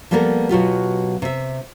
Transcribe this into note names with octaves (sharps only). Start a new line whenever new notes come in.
F3 G3 A#3 B3 A4 A#4
B2 F#3 F4 G4
C3 E5